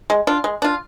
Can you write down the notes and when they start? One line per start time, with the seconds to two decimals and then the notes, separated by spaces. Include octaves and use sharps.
0.10 G#3
0.27 D4 F4
0.44 G#3
0.62 D4 F4